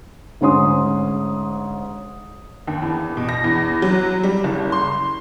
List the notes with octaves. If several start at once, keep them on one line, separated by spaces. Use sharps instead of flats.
D2 G#2 C#4 C6 D#6
D#2
E2
B2
A#6
E2
F#3
G3
F#1
C6